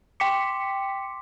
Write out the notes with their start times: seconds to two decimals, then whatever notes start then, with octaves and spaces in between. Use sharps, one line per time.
0.20 G5 C6 D6 B6 C#7